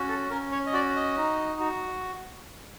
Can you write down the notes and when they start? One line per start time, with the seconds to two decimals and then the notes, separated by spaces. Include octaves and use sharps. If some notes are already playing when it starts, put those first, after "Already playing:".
Already playing: C#4 F#4
0.09 A4
0.30 C#4 A#4
0.52 C#5
0.66 D#5
0.73 F#4 D5
0.96 D#5
1.17 D#4
1.60 F#4